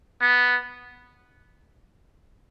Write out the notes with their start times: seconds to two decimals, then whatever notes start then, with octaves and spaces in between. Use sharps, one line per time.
0.21 B3